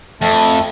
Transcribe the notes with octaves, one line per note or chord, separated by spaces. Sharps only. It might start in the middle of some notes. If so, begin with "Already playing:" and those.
F2 A3